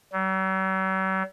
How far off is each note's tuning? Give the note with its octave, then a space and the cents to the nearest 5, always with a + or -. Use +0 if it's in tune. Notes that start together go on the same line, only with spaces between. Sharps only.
F#3 +45